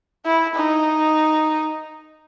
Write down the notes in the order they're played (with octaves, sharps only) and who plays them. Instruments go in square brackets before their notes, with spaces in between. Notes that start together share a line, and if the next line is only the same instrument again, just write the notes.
[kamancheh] E4
D#4